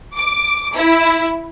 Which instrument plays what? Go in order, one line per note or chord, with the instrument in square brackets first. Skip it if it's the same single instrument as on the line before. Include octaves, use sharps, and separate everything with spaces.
[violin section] D6
E4